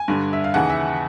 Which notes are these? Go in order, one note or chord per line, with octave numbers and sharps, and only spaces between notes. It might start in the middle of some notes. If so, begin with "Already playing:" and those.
Already playing: G#5
G2 D3
E5
F5
D#2 C#3 E3 F#5
E5